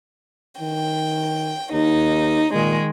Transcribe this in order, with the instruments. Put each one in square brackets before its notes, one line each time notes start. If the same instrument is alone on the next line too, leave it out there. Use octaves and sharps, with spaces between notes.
[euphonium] D#3 [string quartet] G5
[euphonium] D#2 [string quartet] D#4
[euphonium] A#2 [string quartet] D#3 G#3